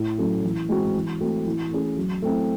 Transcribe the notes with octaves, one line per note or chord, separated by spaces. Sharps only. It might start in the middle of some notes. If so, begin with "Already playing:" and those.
Already playing: A2
F#3 A3 C#4
E3
G#3 C4 F#4
E3
A3 C4 F#4
E3
A3 C#4 G#4
F#3
A3 C4 E4